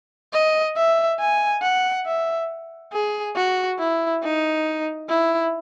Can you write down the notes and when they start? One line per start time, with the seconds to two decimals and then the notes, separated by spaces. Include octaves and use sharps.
0.33 D#5
0.76 E5
1.19 G#5
1.62 F#5
2.06 E5
2.93 G#4
3.36 F#4
3.79 E4
4.23 D#4
5.09 E4